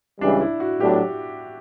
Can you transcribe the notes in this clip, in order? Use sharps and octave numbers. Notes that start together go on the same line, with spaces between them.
C#2 C#3 E3 G3 D4
E4
F#4
A2 F#3 B3 D4 G4